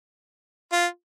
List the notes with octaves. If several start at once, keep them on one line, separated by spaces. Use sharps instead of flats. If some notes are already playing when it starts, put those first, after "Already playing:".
F4